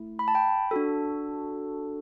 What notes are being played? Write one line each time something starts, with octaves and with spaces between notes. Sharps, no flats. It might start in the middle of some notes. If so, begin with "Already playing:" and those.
Already playing: A3 E4
B5
A5
G5 B5
D4 F#4 A4